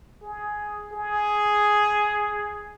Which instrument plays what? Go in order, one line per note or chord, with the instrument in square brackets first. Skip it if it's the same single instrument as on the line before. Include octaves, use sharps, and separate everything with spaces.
[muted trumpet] G#4
G#4